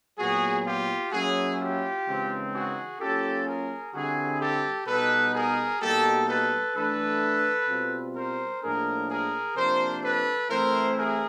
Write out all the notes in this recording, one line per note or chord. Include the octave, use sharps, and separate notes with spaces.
A#2 F#3 B3 F#4 G#4
F4 G4
F#3 A#3 C#4 E4 F#4 G#4
F4 G4
C#3 E3 G#3 C4 D#4
F#4 G#4
F#3 A#3 C#4 F4 G4 A4
G#4 A#4
D3 G3 C4 E4 F#4 G#4
G4 A4
B2 G3 B3 D#4 A4 B4
G#4 A#4
B2 G3 A#3 D#4 G4 A4
A4 B4
E3 A3 D4 A4 B4
B2 G3 C4 F4
A#4 C5
A2 F3 A#3 D4 G#4 A#4
G#4 A#4
C3 F3 A#3 D4 A#4 C5
A4 B4
E3 A3 C4 E4 A#4 C5
G#4 A#4